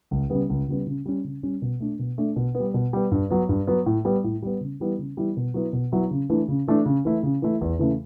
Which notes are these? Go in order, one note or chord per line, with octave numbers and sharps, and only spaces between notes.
C#2
C#3 G3 B3
C#2
C#3 G3 B3
C#3
G3 C#4
C#3
G3 C#4
B2
A3 D4
B2
A3 D4
B2
B3
G3
B2
G3 B3
G2
F#3 B3
G2
F#3 B3
A2
G3 B3
A2
G3 B3
C#3
E3 G3 B3 E4
C#3
E3 G3 B3 E4
B2
F#3 B3 E4
B2
F#3 B3 E4
C#3
E3 A3 D4
C#3
E3 A3 D4
C#3
E3 A3 E4
C#3
E3 A3 E4
E2
C#3 E3 A3